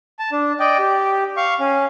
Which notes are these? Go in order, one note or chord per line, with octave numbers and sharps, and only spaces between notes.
A5
D4
D5 D#5 G5
G4
F5 C#6
C#4